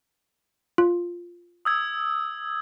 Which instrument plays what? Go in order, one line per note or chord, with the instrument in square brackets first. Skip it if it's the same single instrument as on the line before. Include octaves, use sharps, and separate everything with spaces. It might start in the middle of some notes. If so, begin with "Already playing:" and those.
[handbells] F4
[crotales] D#6 E6 G#6